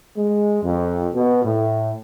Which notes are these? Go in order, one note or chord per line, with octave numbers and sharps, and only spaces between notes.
G#3
F2
B2
A2